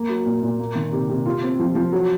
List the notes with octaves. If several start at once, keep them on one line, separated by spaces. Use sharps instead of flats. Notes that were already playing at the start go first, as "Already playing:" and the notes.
Already playing: A#3
F#3
A#2
A#2
A#3
D#3
C3
C3
F4
C4
F3
F3
F#3